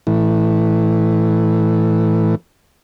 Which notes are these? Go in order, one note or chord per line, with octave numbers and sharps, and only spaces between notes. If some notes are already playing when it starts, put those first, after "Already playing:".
A2 E3